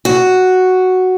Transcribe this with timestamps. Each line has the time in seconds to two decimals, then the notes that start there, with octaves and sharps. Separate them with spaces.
0.05 F#4